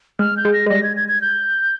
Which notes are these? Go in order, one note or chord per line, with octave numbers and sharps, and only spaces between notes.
G#3 F6
G6
G#3
A#6
G#3
G3 A#6
G#6
G#6
G#6
G6